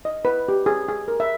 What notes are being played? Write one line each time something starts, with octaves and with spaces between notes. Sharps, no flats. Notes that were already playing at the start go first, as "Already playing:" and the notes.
D#5
B4
G4
G#4
G#4
A#4
E5